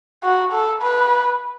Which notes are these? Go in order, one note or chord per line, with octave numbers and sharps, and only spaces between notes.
F#4
A4
B4